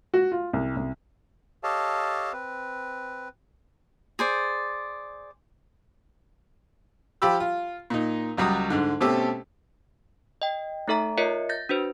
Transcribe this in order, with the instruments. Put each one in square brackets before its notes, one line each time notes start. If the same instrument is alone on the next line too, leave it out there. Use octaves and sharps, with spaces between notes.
[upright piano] F#4
F4
C2
C2
[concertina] G4 A4 C#5 D#5 F5 A5
C4 B4
[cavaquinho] G#4 C5 D5
[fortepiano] F3 F4 G4 G5 B5 E6
F4
A#2 D#4
C#2 F#3 G3 F#4 D#6
G#2 D3
B2 A3 C4 C#4 G4 A4
[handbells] D#5 G5
A3 D#4 A4 E5 A#5
F4 A#4 C#5 D#5 E5 C#7
G6 A6 A#6
D4 F#4 B4 C5